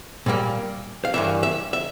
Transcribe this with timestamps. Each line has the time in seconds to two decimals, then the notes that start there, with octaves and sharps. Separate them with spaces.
0.26 A#2 G3 A#3
1.05 F5
1.14 G2 E3 A#3 E5
1.43 E5
1.73 E5